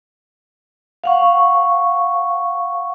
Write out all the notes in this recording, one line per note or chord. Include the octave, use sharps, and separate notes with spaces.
F5 F#5 C#6